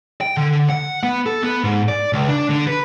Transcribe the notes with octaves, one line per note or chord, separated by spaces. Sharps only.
G5
D3
F#5
B3
A4
B3
G#2
D5
C#2
D4
D3
B4